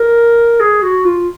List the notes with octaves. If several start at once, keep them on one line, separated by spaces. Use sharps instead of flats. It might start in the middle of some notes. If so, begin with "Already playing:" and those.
Already playing: A#4
G#4
F#4
F4